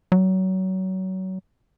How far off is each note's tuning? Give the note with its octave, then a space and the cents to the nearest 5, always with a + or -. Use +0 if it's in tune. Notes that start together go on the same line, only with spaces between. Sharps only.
F#3 +25